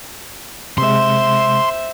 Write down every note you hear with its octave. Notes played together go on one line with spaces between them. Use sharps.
C3 G#3 C5 E5 C6